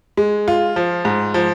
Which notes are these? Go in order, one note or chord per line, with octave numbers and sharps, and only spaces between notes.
G#3
F4
F3
G#2
F3